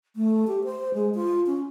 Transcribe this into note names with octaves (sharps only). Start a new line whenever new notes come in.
A3
G4
C5
G#3
F4
C#4